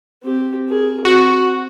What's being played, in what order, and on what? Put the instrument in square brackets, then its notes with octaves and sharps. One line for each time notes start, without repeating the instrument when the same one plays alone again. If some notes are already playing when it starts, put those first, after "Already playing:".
[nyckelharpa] C4 G4
G#4 A#4
[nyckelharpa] C4 [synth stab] F#4